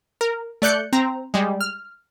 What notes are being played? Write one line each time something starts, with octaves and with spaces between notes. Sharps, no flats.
A#4
A3 D5 F#6 G6 C#7
C4 A#5
G3 G#3
F6